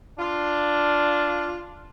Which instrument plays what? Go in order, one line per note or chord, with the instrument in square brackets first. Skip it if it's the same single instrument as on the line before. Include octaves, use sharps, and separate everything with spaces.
[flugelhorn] D4 [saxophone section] F4